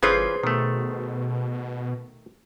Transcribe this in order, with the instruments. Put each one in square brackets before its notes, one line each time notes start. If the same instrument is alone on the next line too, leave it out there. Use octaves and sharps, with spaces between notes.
[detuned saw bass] G1 [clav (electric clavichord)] E3 C#4 F4 [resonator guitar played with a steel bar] G#4 B4 C5
[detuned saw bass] B2 [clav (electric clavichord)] D#3 A3